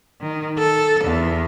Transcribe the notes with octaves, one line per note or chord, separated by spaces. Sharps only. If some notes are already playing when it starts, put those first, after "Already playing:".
D#3
A4
E2